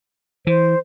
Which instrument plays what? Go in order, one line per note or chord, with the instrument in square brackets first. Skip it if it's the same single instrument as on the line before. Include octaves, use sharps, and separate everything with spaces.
[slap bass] E3 [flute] C5